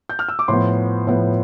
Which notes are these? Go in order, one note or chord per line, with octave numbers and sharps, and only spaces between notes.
G6
F6
E6
D6
A2 F3 B3 C6
A2 F3 B3